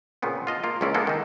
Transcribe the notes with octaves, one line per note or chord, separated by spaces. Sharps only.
A#2 C#3 B3 C4
F4 D#5 A5
A#3 F4
C#2 A#3 C#4 E4 D5
G#3 A#3 B3 E4 A4
D#3 D#4